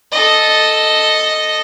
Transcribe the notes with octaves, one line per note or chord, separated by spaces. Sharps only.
A4 D#5